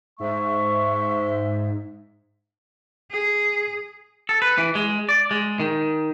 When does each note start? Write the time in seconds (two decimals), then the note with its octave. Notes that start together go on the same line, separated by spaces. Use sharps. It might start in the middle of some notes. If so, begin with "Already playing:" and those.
0.20 G#2 G#3 C5 E5 C#6
3.11 G#4
4.29 A4
4.42 B4
4.58 E3
4.75 G#3
5.09 D5
5.31 G#3
5.60 D#3